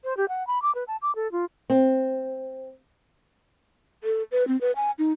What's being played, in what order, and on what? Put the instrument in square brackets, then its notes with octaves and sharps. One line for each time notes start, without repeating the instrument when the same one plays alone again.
[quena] C5
G4
F#5
B5
D6
B4
A5
D6
A4
F4
[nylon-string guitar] C4
[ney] A4
B4
C4
B4
G#5
D#4